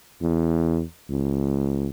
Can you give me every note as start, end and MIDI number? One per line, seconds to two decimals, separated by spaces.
0.22 0.82 40
1.09 1.89 37